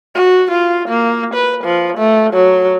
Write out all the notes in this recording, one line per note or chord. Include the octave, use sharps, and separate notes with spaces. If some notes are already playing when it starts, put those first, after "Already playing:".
F#4
F4
A#3
B4
F3
A3
F#3